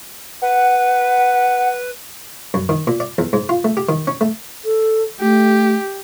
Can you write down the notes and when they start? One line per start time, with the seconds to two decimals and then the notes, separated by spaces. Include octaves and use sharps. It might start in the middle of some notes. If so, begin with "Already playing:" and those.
0.42 B4 F#5
2.54 F#2
2.69 D#3
2.87 A#2
3.00 D5
3.18 E2
3.33 G#2
3.49 F4
3.65 A3
3.77 G4
3.89 D#3
4.07 C#4
4.21 A3
4.64 A4
5.20 A3 G4